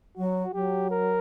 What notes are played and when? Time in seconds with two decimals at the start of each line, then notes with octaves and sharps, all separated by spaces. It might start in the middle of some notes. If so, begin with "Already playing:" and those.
0.18 F#3 F#4
0.54 F#3 G4
0.91 A#4